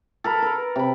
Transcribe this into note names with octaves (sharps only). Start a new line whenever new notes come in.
A4 A#4 B5
A#4 B4
C3 B5